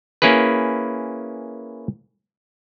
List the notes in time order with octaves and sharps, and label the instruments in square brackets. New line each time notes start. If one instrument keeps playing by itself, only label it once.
[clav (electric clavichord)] A#3 C#4 E4 G#4 B4